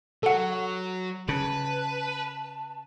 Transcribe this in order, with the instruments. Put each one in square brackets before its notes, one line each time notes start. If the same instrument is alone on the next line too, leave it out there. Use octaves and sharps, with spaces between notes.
[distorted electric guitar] F#3 [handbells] A4 F#5
[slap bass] C#3 [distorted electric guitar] B4 [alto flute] A5